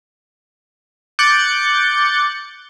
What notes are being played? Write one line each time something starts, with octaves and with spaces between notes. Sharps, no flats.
D6 F#6 G6 A6 C#7